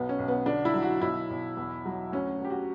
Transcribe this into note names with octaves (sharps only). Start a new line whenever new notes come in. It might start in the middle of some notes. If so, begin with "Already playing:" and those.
Already playing: B1 B3
C#4
B1
B3
D3 D4
E4
F#3
F#4
B1 E4
B1
E2
F#3
D2 C#4
D2 G4
F#4